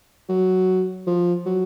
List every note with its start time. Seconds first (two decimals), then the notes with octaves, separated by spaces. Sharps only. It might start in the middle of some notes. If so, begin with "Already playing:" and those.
0.29 F#3
1.07 F3
1.45 F#3